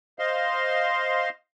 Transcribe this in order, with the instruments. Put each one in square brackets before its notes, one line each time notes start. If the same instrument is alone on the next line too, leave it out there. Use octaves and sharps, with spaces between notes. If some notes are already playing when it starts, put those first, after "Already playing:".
[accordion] C5 D#5 F5 C6